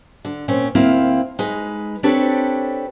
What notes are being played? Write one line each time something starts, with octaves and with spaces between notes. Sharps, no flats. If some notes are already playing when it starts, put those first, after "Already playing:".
D3
A#2 C4 C#4
D2 A#3 C4 E4 F5
G#3 D#4 B4
C4 D4 G4 A4 B4 C#5